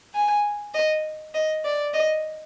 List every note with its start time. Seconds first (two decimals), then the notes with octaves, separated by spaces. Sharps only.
0.14 G#5
0.74 D#5
1.34 D#5
1.65 D5
1.94 D#5